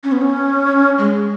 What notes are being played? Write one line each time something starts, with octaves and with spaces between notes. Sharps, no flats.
C#4
B3
C#4
G#3